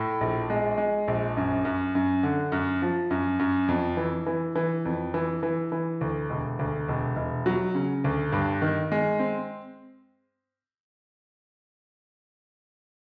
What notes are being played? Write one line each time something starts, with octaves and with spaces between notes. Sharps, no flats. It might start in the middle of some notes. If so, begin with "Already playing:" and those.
Already playing: A2
A#1
G#3
G#3
A#1
F#2
F#2
F#2
D3
F#2
F3
F#2
F#2
F2
E3
E3
E3
F2
E3
E3
E3
D2
E1
D2
E1
E1
F#3
C#3
D2
G2
D#3
G#3
C4